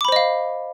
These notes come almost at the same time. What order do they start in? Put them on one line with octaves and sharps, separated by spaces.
D6 B5 C5 D#5 F5